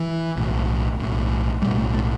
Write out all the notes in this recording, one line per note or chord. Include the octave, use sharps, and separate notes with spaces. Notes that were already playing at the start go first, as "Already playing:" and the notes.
Already playing: E3
B1 A2
B1 A2
B1 A2 G3
A3
A3